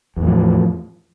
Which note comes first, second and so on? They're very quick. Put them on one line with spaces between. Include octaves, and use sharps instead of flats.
E2 A2 F3